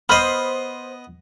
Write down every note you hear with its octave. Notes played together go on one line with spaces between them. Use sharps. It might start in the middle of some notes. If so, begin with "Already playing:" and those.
B3 C5 D#5 B5 F6